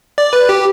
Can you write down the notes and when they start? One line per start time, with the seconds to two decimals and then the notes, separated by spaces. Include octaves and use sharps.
0.18 D5
0.33 B4
0.49 G4